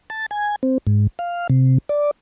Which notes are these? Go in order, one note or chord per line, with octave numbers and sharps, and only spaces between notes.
A5
G#5
C4
G#2
F5
C3
D5